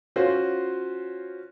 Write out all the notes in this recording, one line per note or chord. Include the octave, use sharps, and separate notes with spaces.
C#4 F4 F#4 C5 C6